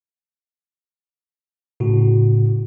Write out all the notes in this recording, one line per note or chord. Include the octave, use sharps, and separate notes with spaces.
A2 C#3 F#4